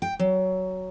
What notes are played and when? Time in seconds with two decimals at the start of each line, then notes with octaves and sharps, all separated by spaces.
0.02 G5
0.19 F#3